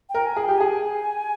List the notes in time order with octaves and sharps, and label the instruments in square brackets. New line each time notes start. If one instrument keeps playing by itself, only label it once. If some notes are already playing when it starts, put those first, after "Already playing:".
[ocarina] G5
[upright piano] A#4
[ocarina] G#5
[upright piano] G#4
[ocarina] G5
[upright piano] G4
[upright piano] G#4 [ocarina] G#5